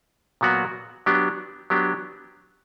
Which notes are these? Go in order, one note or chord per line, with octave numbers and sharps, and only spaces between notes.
A#2 F#3 B3 F#4 A#4
F#3 B3 D4 G4
F#3 B3 D4 G4